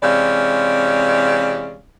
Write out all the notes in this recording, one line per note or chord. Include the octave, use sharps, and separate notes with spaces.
C3 E3 G#3 C#4 D5 F5